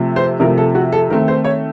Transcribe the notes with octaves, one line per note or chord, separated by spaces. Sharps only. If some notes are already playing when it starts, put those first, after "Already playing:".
Already playing: C3 F3 A3
C5
C3 F3 A3 A#4
A4
F#4
A4
D#3 A3 C4 A#4
C5
C#5